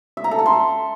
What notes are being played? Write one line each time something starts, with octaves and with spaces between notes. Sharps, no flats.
E5
A#5
A4
A5
C6